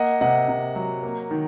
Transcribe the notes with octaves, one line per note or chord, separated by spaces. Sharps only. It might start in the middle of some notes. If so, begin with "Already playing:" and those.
Already playing: A#3 D#5 F#5
C3 D#5 F#5
C3
F#3
A#3
D#3